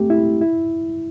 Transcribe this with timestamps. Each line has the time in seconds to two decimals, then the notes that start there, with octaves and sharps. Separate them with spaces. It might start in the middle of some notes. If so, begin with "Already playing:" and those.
Already playing: A3 C4 G4
0.10 E4
0.41 E4